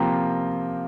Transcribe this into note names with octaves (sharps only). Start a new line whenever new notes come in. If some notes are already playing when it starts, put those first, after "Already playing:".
Already playing: C3 F3 A#3 F4 G5 A#5